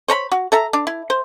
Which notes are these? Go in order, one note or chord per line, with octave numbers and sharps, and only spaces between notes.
C5 C#5 A#5 B5
F#4
A4 E5 A#5
D4
E4
C5